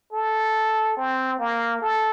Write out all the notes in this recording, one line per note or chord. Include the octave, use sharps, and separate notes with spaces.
A4
C4
A#3
A4